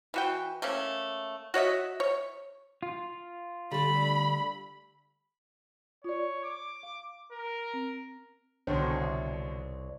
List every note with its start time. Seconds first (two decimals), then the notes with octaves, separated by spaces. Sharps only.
0.14 E3 F#4 G5
0.62 A3 A#3 C#4
1.54 F#4 C#5 D#5 E5
2.00 C#5
2.83 F4
3.72 D3 G3 A3 B5
6.04 F4 C#5 D5
6.44 D6
6.83 F5
7.32 A#4
7.74 C4
8.67 C2 B2 D3 D#3 D4 C5 C#5